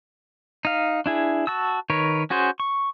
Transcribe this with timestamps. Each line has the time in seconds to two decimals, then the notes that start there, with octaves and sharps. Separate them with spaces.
0.65 D#4 F5
1.06 D4 E4 G#4
1.47 F#4 A5 E6
1.90 D#3 A#4 B4 C#5
2.30 C#4 F#4 G#4 C5
2.60 C#6